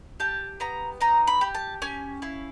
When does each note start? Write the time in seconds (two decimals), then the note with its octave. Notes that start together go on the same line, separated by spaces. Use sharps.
0.20 G4 A5
0.60 B3 A#5
1.01 D#4 A#5
1.27 B5
1.41 G4
1.55 A5
1.82 C#4 G#5
2.22 E4 F5